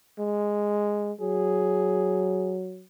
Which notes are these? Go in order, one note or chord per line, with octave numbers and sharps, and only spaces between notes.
G#3
F#3 G#4